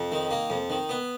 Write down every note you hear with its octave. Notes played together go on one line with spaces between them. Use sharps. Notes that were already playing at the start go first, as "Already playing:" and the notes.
Already playing: F2
D#3
A#3
F2
D#3
B3